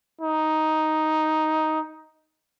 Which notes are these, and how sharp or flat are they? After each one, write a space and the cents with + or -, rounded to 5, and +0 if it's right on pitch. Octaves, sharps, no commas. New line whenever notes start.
D#4 +5